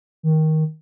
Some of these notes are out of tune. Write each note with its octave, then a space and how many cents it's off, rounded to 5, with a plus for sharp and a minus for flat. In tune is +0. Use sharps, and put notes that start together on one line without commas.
D#3 +15